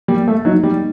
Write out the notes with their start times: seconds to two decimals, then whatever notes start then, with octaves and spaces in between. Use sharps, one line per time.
0.08 G3 A#3
0.28 A3
0.45 F#3 D#4
0.63 G3